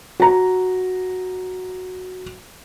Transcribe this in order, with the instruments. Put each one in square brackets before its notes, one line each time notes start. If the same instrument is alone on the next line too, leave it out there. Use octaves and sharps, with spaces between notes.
[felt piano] F#4 A#5